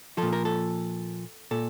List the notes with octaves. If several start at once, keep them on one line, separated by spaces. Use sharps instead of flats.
A#2 F3 A4
A#4
A4
A#2 A4